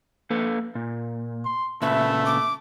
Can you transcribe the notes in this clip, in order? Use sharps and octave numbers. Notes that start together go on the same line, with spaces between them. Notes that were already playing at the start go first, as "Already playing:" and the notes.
A#3 A4 B4
A#2
C6
A#2 C#3 A3 B4 E5
D6